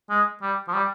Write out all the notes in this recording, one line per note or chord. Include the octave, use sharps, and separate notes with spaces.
G#3
G3
F3
G3